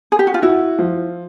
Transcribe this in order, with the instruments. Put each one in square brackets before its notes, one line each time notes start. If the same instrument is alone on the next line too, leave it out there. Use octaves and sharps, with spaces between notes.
[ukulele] G#4
G4
F#4
F4
[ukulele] E4 [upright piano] F#4
[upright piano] F3